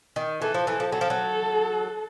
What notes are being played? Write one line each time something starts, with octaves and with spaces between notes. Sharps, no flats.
D#3
E3 A4
F3
E3
F3
F#3 A4
F3
F#3